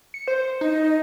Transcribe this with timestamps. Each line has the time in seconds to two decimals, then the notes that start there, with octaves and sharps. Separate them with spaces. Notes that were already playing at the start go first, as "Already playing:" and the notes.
0.14 C#7
0.28 C5
0.61 D#4 D#5